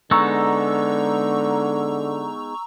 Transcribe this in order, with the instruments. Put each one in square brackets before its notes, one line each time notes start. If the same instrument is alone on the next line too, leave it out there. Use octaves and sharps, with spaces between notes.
[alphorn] D3 [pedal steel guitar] G#3 B3 D#4 [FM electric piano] A#5 C#6 E6